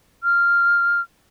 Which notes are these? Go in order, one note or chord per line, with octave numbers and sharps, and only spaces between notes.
F6